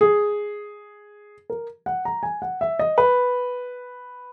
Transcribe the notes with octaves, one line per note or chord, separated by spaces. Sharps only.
G#4
A#4
F#5
A#5
G#5
F#5
E5
D#5
B4